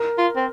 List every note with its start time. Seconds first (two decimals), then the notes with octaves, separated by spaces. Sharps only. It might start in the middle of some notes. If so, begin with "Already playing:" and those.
Already playing: A#4
0.18 F4
0.36 C4